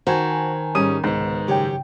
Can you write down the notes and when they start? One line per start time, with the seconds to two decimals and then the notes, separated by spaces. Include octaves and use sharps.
0.07 D#3 F#4 C5 G#5 A5
0.75 G#2 G3 C#4 D#6 D#7
1.04 C2 G#2 C#3 B3
1.47 F#2 C#3 G4 C#5 G5